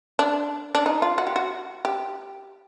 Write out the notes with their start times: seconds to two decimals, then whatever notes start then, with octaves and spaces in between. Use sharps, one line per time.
0.19 D4
0.75 D4
0.86 D#4
1.02 F4
1.18 F#4
1.27 G4
1.36 F#4
1.85 G4